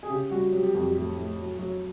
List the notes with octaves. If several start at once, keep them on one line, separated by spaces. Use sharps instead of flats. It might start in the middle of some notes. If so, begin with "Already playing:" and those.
G#4
C#3 G4
G3 F#4
F#3 G4
G4
F2 F#4
G4
A2 G4
A2
F#3
F#3